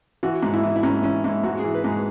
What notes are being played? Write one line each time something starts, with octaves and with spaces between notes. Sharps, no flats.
E3 F#4
G#2
E4
E3
E4
G#2 C#4
E3 C#4
G#2 E4
G#2 F#4
G#4
E3
B4
G#2
G#4